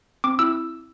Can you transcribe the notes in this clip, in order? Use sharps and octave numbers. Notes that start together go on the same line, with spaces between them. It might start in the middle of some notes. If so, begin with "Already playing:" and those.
C4 D6
E4 E6